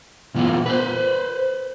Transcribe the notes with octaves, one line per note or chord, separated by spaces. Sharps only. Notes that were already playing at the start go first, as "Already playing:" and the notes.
A#2 E3 B3 C#4 E4 F4
B4 C5